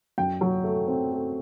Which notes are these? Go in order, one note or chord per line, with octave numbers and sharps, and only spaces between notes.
F#2 G5
F#3
A3
C4
A3